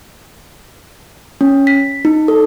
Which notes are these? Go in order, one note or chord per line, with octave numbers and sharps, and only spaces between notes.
C#4
B6
D#4
A4